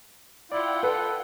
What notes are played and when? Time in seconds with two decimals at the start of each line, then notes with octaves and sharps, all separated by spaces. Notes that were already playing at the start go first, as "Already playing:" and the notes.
0.52 E4 F4 D5 F#5 G5
0.83 A4 B4